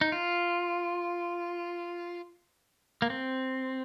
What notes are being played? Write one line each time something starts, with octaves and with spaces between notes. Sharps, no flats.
D#4
F4
A#3
C4